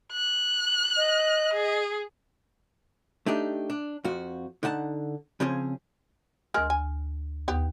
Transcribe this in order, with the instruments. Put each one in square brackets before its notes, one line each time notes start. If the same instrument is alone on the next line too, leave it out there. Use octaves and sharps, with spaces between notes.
[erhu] F#6
[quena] D#5
[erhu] G#4
[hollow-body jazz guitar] A3 D4 D#4 G4
D4
F2 F3 F#4
D3 D#4 F#5 A5
C#3 F3 C4 C#4 G#4
[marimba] D2 F6 [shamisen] G#3 G#4 A#4
[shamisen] G#5
[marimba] D#2 [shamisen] B3 G4